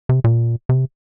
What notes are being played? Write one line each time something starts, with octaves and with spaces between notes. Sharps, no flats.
C3
A#2
C3